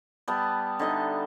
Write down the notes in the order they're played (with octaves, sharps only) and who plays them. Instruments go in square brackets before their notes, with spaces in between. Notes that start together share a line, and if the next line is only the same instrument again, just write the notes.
[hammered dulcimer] G3 B3 A5
D3 D#4 D#5 E5